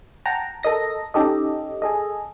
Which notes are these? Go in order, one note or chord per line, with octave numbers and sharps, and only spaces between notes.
F#5 G5 A5 A#5
A4 A#4 D#5 A#6
C#4 D#4 G4 A4 D#5
G#4 A4 D#5